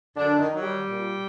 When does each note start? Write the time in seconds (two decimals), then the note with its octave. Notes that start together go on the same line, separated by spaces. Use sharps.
0.17 F#2 D3 D4
0.39 D#3 D#4
0.51 D#3 F#3
0.61 G3 G4
0.84 A#2